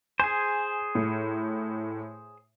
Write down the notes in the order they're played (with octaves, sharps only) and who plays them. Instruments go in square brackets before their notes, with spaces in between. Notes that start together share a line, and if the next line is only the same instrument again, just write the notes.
[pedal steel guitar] G#4 C5 [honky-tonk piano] G#5
[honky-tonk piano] A2